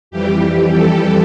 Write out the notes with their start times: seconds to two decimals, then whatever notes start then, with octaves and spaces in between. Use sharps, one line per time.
0.11 F2 E3 G3 G4
0.42 G4
0.73 A4